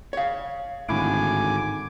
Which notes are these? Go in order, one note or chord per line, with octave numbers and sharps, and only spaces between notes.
C#5 F5
G#1 A2 D3 G#5 D6